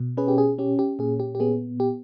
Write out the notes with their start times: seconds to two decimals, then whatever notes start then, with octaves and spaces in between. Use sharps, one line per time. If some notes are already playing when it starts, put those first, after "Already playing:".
Already playing: B2
0.17 C#4 G#4 B4
0.28 G4
0.38 G#4
0.58 C#4 G4
0.79 G4
0.99 A#2 G#4
1.20 G4
1.35 G4
1.40 B3 G#4
1.80 G4